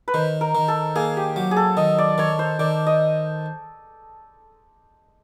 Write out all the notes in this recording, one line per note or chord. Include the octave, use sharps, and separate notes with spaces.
B4
D#3 C5
A#4
D#3
A4
A#3 G#4
G4
F#3
G#4
A4
D#3 D#5
D5
D#3 C#5
C5
D#3 D5
D#5